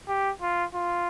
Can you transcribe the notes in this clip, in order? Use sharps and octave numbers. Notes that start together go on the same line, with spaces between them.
G4
F4
F4